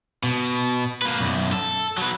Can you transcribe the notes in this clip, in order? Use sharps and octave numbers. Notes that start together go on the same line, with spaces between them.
B2
A#3 B4
B1 F#2
A4
F#3 B4